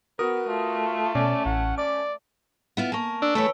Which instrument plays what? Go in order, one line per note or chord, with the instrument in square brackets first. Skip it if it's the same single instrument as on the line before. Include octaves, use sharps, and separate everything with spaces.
[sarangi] B3 [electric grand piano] F#4 A#4 [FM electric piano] D#6
[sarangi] A3 [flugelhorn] F4
[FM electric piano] B2 [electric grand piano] C#4 [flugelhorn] D5
[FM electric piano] A1 [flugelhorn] F#5
[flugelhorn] D5 [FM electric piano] D6
[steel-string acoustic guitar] B3 E4 F4
[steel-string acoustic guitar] A#3 A#4 [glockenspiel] G#5 A5 C#6
[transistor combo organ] D4 [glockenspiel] E6 G7
[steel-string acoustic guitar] E3 B4 C#5 [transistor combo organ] A3 [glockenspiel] D7